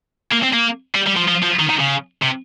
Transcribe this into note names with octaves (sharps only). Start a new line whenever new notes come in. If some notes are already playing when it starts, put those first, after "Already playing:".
A#3
C4
A#3
G3
G3
F3
F3
F3
D#3
D#3
C#3
C3